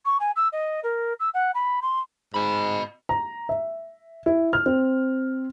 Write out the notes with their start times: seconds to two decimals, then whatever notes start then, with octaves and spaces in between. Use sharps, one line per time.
0.05 C#6
0.20 G#5
0.36 E6
0.52 D#5
0.83 A#4
1.20 E6
1.34 F#5
1.54 B5
1.82 C6
2.34 G#2 D#5 B5
3.09 A#5
3.49 E5
4.26 E4
4.53 F6
4.66 C4